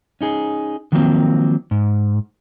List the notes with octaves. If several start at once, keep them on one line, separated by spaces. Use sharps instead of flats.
C#4 D#4 G#4
D3 D#3 F3 F#3 A#3 C4
G#2